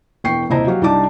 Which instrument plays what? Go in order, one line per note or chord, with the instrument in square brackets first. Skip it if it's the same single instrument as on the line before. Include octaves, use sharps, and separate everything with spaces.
[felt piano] E1 E2 G5 C#6 C7
D#1 C3 E4 C5 D#5 A#5
F#3 F#4 G4 F5
C2 G3 D4 D#4 A5 D6